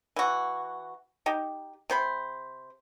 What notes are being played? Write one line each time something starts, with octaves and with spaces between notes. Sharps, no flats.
E3 F#4
D#4 G4
C3 C5 B5